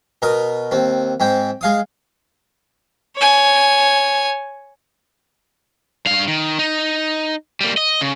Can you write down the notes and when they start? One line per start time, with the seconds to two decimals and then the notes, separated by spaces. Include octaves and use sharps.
0.22 B2 A#4 A#5 D#6
0.71 D#2 C4
1.20 G#2 C4 G5
1.61 G#3 F5 D#6
3.16 C#5 G#5
6.06 G2 F5
6.28 D#3
6.59 D#4
7.61 G3 A#3
7.77 D#5
8.01 C#3